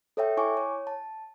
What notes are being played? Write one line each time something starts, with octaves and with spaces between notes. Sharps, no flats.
A4 C#5 E5 G5
E4 C#5 G#5 C#6 D6
C#5
A5